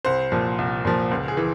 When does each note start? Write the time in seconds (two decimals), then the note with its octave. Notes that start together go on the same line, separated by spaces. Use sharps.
0.05 C2 C5
0.32 A#2 F3
0.58 C2
0.85 A#2 F3
1.11 C#2
1.28 G#4
1.37 E3